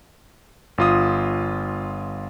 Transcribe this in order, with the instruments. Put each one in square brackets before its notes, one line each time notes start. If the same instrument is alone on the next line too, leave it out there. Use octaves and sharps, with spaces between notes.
[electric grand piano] G1 F4 D#6